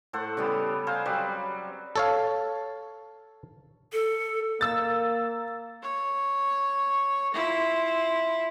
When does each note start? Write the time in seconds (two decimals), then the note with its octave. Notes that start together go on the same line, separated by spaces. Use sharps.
0.13 A2 A4 C5 F#5
0.37 C#3 G3 B3
0.87 G#4 C5 F5 A#5
1.06 F#3 G3 C4 B4
1.96 A4 C#5 F5
3.92 A4
4.61 A#3 E6 A6
5.82 C#5
7.34 E4 F4